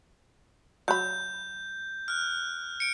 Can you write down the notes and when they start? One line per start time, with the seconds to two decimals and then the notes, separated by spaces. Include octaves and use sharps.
0.88 F#3 B5 G6
2.08 F6 F#6
2.80 C#7 D7